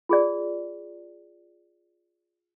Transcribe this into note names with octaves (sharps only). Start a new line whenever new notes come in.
F4 G#4 D5